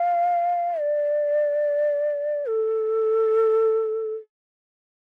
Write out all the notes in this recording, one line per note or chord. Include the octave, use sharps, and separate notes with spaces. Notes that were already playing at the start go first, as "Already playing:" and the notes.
Already playing: F5
D5
A4